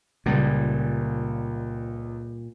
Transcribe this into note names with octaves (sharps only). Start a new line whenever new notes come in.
C#2 A#2 G3